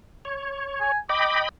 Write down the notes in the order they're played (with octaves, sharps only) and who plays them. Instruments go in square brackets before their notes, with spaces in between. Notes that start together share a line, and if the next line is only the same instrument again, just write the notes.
[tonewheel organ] C#5
[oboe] G#5
[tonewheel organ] D#5 G5 B5 [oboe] D6